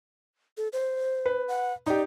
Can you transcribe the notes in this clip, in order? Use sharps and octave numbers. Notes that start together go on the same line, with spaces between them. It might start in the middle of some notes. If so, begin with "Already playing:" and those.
A4
C5
B4
F#5
D#4 G4 D5